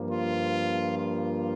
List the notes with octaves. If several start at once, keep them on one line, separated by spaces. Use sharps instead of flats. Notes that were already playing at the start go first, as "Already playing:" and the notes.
Already playing: G2 F3 A#3
F4
F4